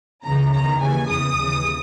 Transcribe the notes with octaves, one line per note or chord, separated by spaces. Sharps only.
C#2 C#3 E3 A#5
E2 D#3 A#5
D#2 C#3 E3 G#5
E2 C#3 E3 D#6
D#2 C#3 E3